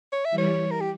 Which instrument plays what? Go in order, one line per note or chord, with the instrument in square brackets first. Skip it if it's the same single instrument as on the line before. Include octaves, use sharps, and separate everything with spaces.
[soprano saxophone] C#5
E5
[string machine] E3 G3
[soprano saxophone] C#5
A#4
G4